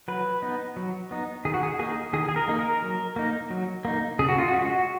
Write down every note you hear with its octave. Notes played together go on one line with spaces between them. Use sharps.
F#3 B4
B3 D#4
F#3
B3 D#4
D#3 G#4
F#4
G#4
A#3 D#4 G#4
D#3 G#4
G#4
A#4
A#3 D#4
A#4
F#3
A#3 D#4
F#3
A#3 D#4
C#3 G#4
F#4
F4
F#4
G#3 C#4